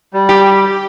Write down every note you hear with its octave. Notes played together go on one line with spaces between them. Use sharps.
G3
G4